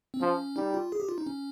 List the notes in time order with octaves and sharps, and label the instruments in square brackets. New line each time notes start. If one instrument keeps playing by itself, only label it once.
[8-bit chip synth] C4
[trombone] F3 [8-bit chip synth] C#4
[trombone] G3 [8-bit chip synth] D#4
[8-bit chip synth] F4
G#4
G4
F4
D#4
C#4